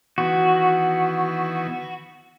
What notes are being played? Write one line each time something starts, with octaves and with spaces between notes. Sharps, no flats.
D#3 E3 B3 F#4